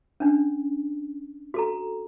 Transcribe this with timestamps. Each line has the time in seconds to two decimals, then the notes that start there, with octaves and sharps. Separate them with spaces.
0.20 C#4 D4
1.54 F#4 A4 A#5